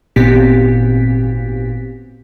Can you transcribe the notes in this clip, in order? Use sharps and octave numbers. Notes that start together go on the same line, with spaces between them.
G#1 A#2 B3 C4 G4 B6